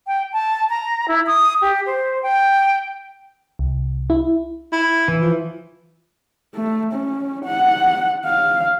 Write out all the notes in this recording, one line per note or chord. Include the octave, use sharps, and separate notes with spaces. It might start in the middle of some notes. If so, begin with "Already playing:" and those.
G5
A5
A#5
E4
D#6
G4
C5
G5
C2
E4
E4
E3
F3
A3
C#4
F#5
F5